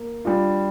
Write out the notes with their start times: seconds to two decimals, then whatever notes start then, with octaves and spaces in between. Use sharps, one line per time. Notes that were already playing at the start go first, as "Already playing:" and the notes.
Already playing: A#3
0.25 G3 D4 F4